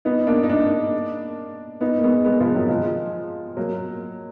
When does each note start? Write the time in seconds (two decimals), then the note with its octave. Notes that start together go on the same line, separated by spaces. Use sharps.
0.05 B3 D#4
0.27 A#3 D4
0.43 D#4
0.49 A#3 D4
1.81 B3 D#4
1.98 A#3
2.03 G#3 B3
2.25 G#3 B3
2.39 F3 G#3
2.54 D#3 F#3
2.69 F3 G#3
3.57 F#3 A#3